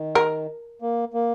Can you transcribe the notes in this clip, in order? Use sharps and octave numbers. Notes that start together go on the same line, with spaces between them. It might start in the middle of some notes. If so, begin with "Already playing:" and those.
Already playing: D#3
A#4
A#3
A#3